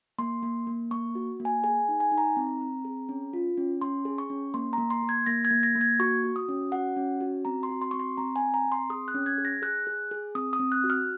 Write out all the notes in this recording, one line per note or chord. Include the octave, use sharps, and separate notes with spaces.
A#3 C6
A#3
A#3
A#3 C#6
F#4
A#3
G#5
G#4 G#5
D#4
G#5
D#4
A#5
C4
C4
G#4
C#4
F4
C#4
C#4 C6
G#4
C#6
C#4
A#3 C6
A#3 A#5
C6
A#3
G#6
A#3 A#6
G#6
A#3
A#6
A#3
G#6
F#4 C#6
F#4
D#6
C#4
F#4 F#5
C#4
F#4
C4 A#5
C6
F#4
C6
C4 C#6
C6
C4 A#5
G#5
C4
A#5
C4
C6
G#4 D#6
F#6
C#4
G#6
G#4
A#6
G#4 F#6
G#4
G#4
C4 D#6
D#6
C4
F#6
F#4
F6